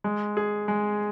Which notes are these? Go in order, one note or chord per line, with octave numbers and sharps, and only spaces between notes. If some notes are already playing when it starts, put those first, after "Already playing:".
G#3
G#4
G#3